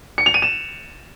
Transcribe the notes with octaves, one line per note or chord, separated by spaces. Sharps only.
C#7
F7
D#7
E7